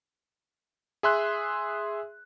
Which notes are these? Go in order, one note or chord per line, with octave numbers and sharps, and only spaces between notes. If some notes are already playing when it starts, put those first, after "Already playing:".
G#4 E5 C6 F#6